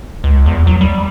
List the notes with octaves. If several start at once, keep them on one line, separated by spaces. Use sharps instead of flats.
C#2
E2
F#3
G3